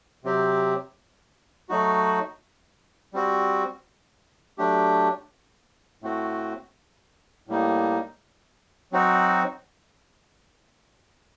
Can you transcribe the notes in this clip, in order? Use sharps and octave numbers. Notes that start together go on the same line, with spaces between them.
C3 F#3 C4 G4
F#3 A3 D#4 F#4
G3 C4 F#4
F#3 A3 D4 G4
A2 A3 C4 F#4
A2 G3 A#3 D#4
F#3 C4 D#4 F#4